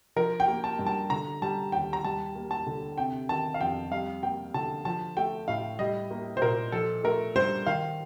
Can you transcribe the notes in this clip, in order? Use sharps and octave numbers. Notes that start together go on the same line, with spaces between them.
F3 A#4
G5
A#3
A5
G2
A5
D3 A#5
G3 A5
D#2 G5
A#5
G3 A5
A#3
A5
D3
C3 G5
D#3 A5
F5
F2 G5
G3 F5
A#3 G5
D3 A5
F3 A5
A3 G5
A2 F5
G3 D#5
A#3
C5
A#2 A#4
F3 A4
A3 A#4
G2 C5
D#3 F5